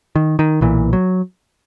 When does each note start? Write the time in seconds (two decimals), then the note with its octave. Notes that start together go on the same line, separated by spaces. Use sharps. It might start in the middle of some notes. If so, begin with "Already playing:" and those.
0.16 D#3
0.39 D#3
0.61 B1 A#2 E3
0.93 F#3